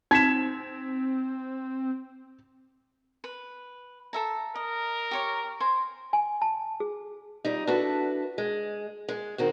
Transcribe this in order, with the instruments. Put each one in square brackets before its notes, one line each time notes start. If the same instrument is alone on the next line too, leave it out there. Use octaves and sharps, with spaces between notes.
[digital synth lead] C4 [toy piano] D#4 [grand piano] G#6 B6 E7
[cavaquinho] B4
A4 E5 A#5
[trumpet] A#4 [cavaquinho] D#5
[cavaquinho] G4 C#5 C#6
C5 G#5
[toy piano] G#5
A5
G#4
[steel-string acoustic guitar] F2 G3 D#4
D4 E4 F#4 A4 B4
G#3
G#3
D#3 C4 F#4